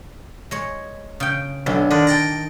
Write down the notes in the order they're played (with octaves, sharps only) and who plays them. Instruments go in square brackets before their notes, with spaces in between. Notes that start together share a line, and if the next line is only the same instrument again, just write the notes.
[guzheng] G#3 C#5
C#3 G5
[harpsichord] B1 [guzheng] D3
[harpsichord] D3 [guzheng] D#3
[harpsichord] G5 A5 A#5